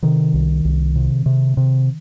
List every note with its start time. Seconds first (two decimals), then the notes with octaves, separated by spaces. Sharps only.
0.03 C3 D#3
0.34 C2
0.65 C2
0.96 C3
1.26 C3
1.57 C3